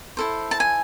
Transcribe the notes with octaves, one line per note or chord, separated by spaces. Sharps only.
E4 A4 C5
A5
G#5